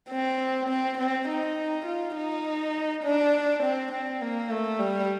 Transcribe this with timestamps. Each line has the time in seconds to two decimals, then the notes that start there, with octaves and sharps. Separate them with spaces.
0.10 C4
0.69 C4
0.98 C4
1.28 D#4
1.86 F4
2.17 D#4
3.04 D4
3.63 C4
3.92 C4
4.22 A#3
4.50 A3
4.79 G3